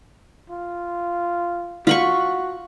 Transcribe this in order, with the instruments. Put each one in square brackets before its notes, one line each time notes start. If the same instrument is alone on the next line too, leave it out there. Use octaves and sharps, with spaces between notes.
[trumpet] F4
[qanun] F4 B5 C#6 [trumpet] F#4